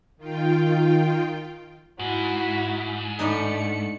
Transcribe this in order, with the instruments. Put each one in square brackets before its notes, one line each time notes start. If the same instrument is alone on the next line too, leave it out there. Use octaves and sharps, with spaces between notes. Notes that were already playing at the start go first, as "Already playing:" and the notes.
[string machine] D#3 F4 G5
[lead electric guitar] G#2 [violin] E4 F#4
[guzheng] A2 D4 D#4 [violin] A3 C#7